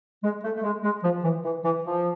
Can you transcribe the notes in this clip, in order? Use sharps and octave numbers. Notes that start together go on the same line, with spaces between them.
G#3
A3
A3
G#3
G#3
F3
E3
E3
E3
F3